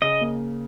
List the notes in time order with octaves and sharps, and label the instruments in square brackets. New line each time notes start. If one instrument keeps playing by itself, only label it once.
[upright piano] C#3 [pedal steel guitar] D#5
[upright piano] A#3